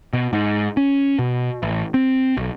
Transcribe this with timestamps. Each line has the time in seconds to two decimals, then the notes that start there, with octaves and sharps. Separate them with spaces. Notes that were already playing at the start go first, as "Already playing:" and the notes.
0.13 B2
0.33 G#2
0.77 C#4
1.19 B2
1.63 A1
1.94 C4
2.37 B1